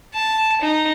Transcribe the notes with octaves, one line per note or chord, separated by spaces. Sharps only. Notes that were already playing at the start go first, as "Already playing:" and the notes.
A5
D#4